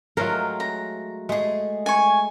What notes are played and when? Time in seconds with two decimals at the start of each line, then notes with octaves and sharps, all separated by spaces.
0.17 F#3 G#3 A3 F4 A#4
0.60 A#5
1.29 G#3 A3 G#4
1.86 G#5 C#6